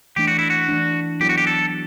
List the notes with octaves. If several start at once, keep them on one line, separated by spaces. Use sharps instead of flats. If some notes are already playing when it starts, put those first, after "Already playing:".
E3 A3 D4 G4
F#4
E4
F#4
E3 A3 D4
F#3 B3 E4 G4 A4
F#4
G4
A4